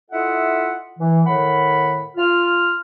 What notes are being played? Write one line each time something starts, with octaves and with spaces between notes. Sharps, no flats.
E4 F4 A4 D#5 E5 F#5
E3
A2 D#3 F#5 B5
F4 F6